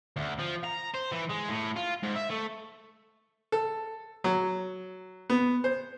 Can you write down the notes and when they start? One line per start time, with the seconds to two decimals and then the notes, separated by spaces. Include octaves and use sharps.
0.16 D2
0.39 F3
0.64 A#5
0.95 C5
1.13 E3
1.30 G#3
1.49 A2
1.77 F4
2.03 G#2
2.16 E5
2.30 A3
3.52 A4
4.24 F#3
5.30 B3
5.64 C5